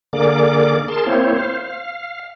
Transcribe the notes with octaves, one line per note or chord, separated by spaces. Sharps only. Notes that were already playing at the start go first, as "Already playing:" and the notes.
D3 A#3 G#4 A#4 D5 D6
G#4 A#4 A5 C6
A#3 C4 E4 C5 C#5
C5 F5
F5